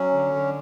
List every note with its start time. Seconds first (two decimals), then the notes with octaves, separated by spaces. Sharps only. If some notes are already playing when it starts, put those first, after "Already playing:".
Already playing: F#3 C#4
0.14 D3
0.34 D3